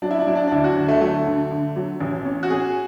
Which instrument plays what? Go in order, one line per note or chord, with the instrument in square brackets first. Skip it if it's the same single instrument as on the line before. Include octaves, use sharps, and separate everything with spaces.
[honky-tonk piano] F#3 [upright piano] D4
[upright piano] E4
D4
[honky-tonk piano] F#3 [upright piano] E4
[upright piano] D4
D4
[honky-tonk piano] D2 [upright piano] E4
[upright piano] F#4
[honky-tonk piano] D2
[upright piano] A3
[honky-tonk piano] F#3 [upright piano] A3
[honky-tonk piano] D3
D3
F#3
A1
C#4
[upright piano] F#4
[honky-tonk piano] C#4 [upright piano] G#4